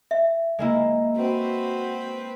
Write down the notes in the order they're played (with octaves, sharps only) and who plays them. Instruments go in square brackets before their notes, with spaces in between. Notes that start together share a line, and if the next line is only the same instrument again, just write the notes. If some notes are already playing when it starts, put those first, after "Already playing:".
[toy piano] E5
[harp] G#3 A#3 E4
[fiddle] C4 B4 [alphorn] F#4